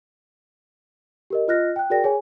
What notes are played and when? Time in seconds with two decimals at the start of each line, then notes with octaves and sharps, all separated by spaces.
1.30 G4 A#4 D#5
1.48 F4 D#5 F6 F#6 A#6
1.76 G5 F#6
1.90 F#4 G#4 A#4 D5 G5 A#6
2.04 G#4 C#5 G#5